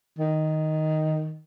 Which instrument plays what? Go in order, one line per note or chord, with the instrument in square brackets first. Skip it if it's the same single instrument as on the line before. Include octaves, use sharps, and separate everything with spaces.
[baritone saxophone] D#3